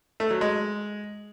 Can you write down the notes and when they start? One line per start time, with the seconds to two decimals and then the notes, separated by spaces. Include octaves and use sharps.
0.20 A3
0.31 F#3
0.41 G#3